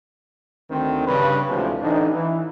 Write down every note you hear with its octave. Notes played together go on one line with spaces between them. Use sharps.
D2 D#3 C4
G2 C#3 B4
A1 D2 A2 C3 F3 G#3
A1 D4 D#4
E3